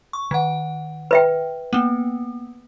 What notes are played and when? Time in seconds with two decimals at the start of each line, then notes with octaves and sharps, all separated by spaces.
0.13 C#6
0.31 D#3 F#5
1.11 B4 E5 G5
1.73 A#3 B3